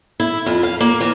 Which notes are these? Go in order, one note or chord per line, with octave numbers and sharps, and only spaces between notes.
E4
F2
F5
A#3
E3